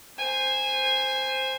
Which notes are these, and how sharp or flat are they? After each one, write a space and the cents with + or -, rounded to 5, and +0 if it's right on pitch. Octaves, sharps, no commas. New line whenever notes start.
C5 +0 G#5 -15